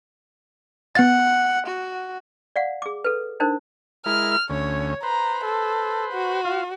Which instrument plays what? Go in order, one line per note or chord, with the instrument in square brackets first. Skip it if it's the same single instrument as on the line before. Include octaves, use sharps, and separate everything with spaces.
[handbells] B3 A6 [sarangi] F#5
[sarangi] F#4
[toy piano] D5 F5 F#5
G#4 D6
A4 B4
D4 D#4 A#4 C5
[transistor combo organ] G#3 E4 A#4 [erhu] F6
[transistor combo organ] D2 C#4 [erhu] C#5
[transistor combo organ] B4 C5 [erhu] A#5
[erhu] A4
F#4
[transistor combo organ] F4 F5